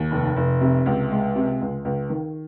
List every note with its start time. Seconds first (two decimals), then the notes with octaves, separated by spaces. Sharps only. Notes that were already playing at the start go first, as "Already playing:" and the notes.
Already playing: D#2
0.11 F1
0.36 F1
0.61 C3
0.86 C#2
1.11 G#3
1.36 C3
1.61 C#2
1.85 C#2
2.10 D#3